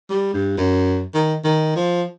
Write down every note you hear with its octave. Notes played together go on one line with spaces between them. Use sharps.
G3
G2
F#2
D#3
D#3
F3